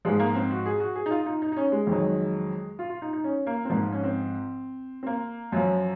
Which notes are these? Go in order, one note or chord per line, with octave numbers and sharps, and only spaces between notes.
G#2 F3 G#3
A#3
C4
F#4
G#4
F#4
G#4
D#4
F4
D#4
D#4
D#4
C#4
G#3
F2 D#3 F#3
F4
F4
D#4
D#4
C#4
A#3
C4
G#2 F3 A#3
C#4
C4
C4
A#3
F#2 F3 F#3